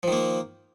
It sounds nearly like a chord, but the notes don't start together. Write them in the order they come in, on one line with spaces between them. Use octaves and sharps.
F3 D#3 A#3